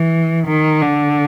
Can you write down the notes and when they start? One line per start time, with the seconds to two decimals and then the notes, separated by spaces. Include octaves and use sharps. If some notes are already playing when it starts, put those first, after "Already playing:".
Already playing: E3
0.47 D#3
0.82 D3